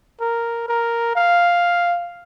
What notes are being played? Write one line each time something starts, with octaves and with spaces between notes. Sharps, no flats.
A#4
A#4
F5